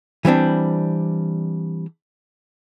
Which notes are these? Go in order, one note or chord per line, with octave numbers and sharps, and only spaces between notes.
E3 G3 C4 D4